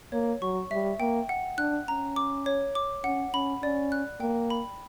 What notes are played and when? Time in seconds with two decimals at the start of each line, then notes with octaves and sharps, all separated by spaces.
0.12 A#3 C#5
0.42 F#3 C#6
0.71 G3 E5
1.00 A#3 G5
1.29 F#5
1.58 D4 F#6
1.88 C#4 A#5
2.16 D6
2.46 C#5
2.75 D6
3.04 C#4 F#5
3.34 C#4 B5
3.62 C#4 D5
3.92 F#6
4.20 A#3 G5
4.50 B5